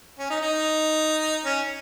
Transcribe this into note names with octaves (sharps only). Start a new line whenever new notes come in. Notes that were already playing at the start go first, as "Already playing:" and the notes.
C#4
D#4
D#4
C#4